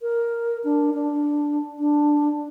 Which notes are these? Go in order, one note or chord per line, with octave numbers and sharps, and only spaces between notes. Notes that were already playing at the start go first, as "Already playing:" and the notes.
A#4
D4
D4
D4